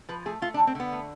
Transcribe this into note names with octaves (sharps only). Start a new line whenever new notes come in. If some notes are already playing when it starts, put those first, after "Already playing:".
F3 B4
A3 G#4
A3 F4
D4
D3
C4
D3 B3
A3